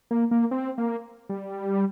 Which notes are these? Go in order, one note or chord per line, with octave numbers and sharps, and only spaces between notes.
A#3
A#3
C4
A#3
G3